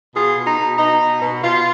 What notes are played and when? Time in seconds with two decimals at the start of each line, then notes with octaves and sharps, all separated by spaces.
0.14 B2 F4 G#4
0.36 B2
0.46 D#4
0.58 B2
0.78 B2 D#4
1.00 B2
1.20 B2
1.42 B2 F4